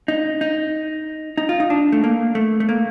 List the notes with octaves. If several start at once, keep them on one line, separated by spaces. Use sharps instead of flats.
D#4
D#4
D#4
F4
D#4
D4
A3
A#3
A3
A3
A#3